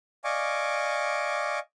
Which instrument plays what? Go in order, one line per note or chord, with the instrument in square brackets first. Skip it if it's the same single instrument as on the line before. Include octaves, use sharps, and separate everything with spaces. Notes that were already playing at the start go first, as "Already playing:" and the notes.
[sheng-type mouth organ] D5 D#5 F5 G#5 C#6 D6